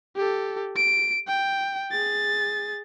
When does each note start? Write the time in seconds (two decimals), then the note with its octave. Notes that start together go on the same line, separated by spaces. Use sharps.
0.16 G4 A4
0.76 D7
1.28 G5
1.91 G#4 A6